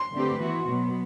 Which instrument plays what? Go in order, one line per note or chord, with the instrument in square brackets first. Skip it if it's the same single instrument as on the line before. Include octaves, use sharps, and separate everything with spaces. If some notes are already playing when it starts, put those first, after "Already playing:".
Already playing: [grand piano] C6
[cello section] D3 A3 C4 G4 B4
E3 B3 F#4
B2 F#3 B3